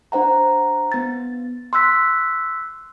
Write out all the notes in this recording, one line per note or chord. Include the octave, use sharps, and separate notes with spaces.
D4 C5 F#5 A#5
B3 A6
C6 E6 F#6 B6